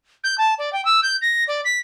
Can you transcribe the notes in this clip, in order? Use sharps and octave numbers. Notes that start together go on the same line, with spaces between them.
G6
A5
D5
G5
E6
G6
A#6
D5
B6